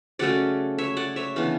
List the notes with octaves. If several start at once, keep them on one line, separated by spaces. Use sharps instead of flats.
C#3 F#3 A3 C#4 D5 F#5
C#5 E5
D5 F#5
C#5 E5
C#3 E3 B3 D4